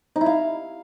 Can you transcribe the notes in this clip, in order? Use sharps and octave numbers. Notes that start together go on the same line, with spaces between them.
D#4
E4
F5